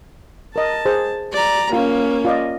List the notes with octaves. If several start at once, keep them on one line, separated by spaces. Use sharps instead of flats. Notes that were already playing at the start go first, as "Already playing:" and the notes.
A#4 D#5 A5
G#4 C5
D5 A#5
A#3 C#4 F4
F4 D5 D#5